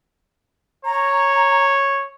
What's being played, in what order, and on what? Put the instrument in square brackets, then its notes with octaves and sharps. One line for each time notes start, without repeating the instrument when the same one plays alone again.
[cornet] C#5 [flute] A#5